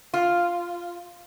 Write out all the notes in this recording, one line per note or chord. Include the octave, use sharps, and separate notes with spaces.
F4